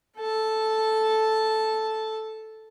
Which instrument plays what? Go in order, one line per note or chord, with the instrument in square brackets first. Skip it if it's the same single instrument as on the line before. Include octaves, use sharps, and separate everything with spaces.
[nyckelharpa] A4 A5